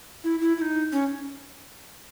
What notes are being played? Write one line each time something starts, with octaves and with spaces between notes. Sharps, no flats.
E4
E4
E4
D#4
C#4